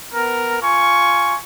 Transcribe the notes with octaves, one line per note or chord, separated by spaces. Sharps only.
B3 A#4
F4 G#5 C#6